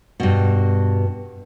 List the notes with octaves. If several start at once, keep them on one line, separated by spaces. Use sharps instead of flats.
G2 B2